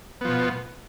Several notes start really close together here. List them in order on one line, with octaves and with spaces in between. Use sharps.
B3 F3 B2